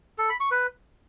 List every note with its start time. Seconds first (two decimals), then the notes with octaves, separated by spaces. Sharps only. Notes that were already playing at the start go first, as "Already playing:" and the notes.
0.18 A4
0.29 B5
0.40 C#6
0.51 B4